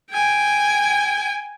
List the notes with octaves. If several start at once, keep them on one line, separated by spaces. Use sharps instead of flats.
G5 G#5